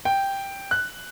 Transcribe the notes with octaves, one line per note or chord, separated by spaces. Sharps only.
G5
F#6